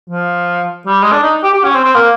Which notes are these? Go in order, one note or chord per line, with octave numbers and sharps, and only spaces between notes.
F3
G3
G#3
D4
D#4
G4
G4
C#4
C4
C4
A#3